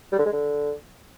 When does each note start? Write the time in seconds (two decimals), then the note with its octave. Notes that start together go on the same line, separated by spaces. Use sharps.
0.12 G3
0.19 D3
0.25 G#3
0.32 D3